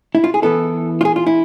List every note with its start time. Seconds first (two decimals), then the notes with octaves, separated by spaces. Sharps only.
0.15 E4
0.24 F4
0.34 G#4
0.42 E3 B3 E4 A4
1.01 F4
1.05 G#4
1.16 F4
1.27 E4